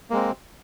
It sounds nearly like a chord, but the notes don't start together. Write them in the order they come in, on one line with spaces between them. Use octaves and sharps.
A#3 G#3 C4